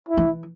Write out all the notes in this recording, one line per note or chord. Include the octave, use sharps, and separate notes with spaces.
E4
E3